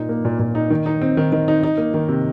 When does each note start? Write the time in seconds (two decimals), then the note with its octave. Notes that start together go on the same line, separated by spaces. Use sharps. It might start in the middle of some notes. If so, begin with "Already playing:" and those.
Already playing: A#2 D#4
0.09 A#3
0.25 A#2
0.39 A#2
0.55 D#4
0.70 D#3
0.86 D#4
1.02 C4
1.17 D#3
1.32 D#3
1.48 D#4
1.63 D#4
1.78 A#3
1.94 D#3
2.08 C3